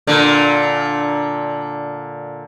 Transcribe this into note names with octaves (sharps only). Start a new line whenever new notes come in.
A#2 D3